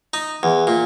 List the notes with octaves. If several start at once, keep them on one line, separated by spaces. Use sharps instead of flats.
D#4
E2
A#2